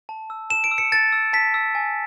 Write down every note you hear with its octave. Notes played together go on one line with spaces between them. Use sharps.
A5
E6
A5 E7
D7
E6
C#7
A5 A6
E6
A5 B6
E6
G#5